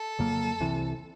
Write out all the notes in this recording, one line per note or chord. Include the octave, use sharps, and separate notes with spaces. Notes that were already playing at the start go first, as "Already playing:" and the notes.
Already playing: A4
F2 C#3 F#3 A#3
C2 C3 E3